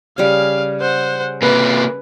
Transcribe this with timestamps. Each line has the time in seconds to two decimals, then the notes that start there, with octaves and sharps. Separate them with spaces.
0.18 C#3 G3 F5
0.81 C5 F#5
1.42 C3 A#3 B4